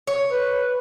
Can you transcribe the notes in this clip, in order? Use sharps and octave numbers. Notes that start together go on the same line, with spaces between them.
C#5
B4